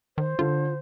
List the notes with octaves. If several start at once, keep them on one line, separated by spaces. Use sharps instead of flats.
D#3 C5
D3 F4 A4